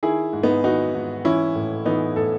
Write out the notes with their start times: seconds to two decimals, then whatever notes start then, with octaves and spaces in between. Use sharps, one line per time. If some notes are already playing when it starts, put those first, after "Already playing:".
0.03 D#3 E4 G#4
0.33 G#2
0.43 B3 D#4
0.64 D#3 D#4 F#4
0.94 G#2
1.25 E3 C#4 E4
1.55 A2
1.86 E3 B3 D#4
2.16 A2 A4